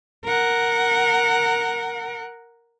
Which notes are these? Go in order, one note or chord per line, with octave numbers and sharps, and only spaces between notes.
A#4 F#5